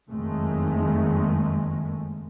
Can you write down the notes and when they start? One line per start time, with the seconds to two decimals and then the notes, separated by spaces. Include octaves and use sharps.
0.10 F#1 F2 D#3 G#3 A3